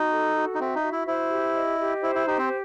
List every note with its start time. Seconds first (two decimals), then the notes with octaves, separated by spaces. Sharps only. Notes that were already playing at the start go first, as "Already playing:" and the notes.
Already playing: D#4 F#4
0.12 A4
0.36 F#4
0.55 D#4
0.59 C4 E5
0.75 D#4
0.83 F#4
0.92 E4
1.08 E4 C5
1.31 G4
1.55 D#5
1.80 G4
2.03 E4 C5
2.15 E4
2.27 D#4 G4
2.38 C4